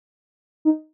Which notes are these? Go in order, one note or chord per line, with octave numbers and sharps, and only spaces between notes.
D#4